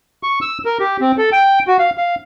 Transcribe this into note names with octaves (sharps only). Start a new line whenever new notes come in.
C#6
E6
A#4
G4
C4
A4
G5
F#4
F5
F5